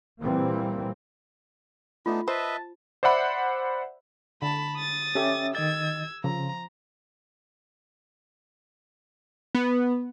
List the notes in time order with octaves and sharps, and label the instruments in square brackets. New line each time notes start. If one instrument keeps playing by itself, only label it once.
[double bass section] A#2 E3 G3 A#3 C4
[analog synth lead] A3 [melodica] B3 D4 D#4 [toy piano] F4
[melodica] B4 D#5 E5 [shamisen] C5 [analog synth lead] A5
[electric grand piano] C5 D5 E5 F#5 B5
[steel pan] D3 [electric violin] A5 B5
[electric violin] D#6 A6
[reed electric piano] C#4 E5 [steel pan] G4 A4
[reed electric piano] D#3 D#5 A6 [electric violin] E6 G#6
[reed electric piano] C#3 [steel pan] F3 [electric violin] A#5
[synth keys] B3